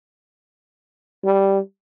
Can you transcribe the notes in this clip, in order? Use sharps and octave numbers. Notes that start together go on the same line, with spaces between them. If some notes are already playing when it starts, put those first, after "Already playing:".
G3